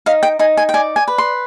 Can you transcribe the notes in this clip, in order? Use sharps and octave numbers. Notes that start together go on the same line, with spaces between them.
D#4 F5
G5
D#4 G#5
G#5
G5
D5 G#5
G#5
B4
C6